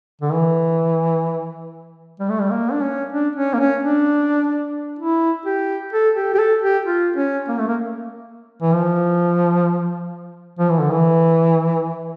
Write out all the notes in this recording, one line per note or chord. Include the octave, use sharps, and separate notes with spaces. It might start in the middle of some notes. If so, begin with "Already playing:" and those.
D3
E3
G3
A3
G3
A#3
D4
C#4
D4
C#4
A#3
C#4
D4
E4
G4
A4
G4
G4
A4
G4
F4
C#4
A#3
A3
A#3
E3
F3
F3
E3
D3
E3